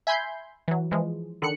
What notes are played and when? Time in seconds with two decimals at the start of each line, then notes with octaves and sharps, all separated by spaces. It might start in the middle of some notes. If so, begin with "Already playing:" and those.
0.07 E5 G#5 B5 C6 G6
0.68 E3 F#3
0.91 E3 F3 G#3
1.42 D3 D#3 F#6 C#7